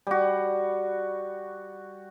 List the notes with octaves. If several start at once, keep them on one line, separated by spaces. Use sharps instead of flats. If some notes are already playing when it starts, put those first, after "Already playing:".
G3 F#4